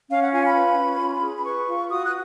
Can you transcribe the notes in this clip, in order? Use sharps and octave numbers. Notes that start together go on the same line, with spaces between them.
C#4 F5
F#5
F4 G#5
B5
B4
C#4
F4
G#4
B5
B4 C#6
F4
F#4 D#6
F#6